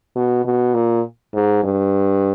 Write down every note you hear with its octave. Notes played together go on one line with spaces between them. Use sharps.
B2
B2
A#2
G#2
G2